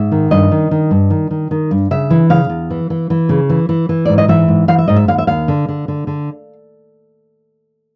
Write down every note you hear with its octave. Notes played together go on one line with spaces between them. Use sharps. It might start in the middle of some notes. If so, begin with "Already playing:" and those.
Already playing: G#2 E5
D#3
G2 D#5
D#3
D#3
G2
D#3
D#3
D#3
G2
C#3 E5
E3
C#3 F5
E2
E3
E3
E3
C#3
E3
E3
E3
G#2 D5
D#5
E3 E5
G#2
E3 F5
E5
G#2 D#5
E5
D#2 F5
E5
D#2 F5
D3
D3
D3
D3